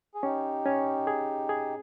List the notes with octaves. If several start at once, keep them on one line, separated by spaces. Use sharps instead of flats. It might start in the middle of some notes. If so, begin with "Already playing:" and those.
G#4
C#4 D#4 G4
C#4
G#4
G#4